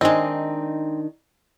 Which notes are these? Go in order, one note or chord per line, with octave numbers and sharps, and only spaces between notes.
D#3 G#3 C4 D4 D#4 D#5